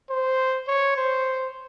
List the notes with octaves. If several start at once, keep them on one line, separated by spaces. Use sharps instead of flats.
C5
C#5
C5